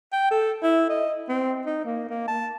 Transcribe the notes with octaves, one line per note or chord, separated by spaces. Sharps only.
G5
A4
E4
D#5
C4
D#4
A#3
A#3
A5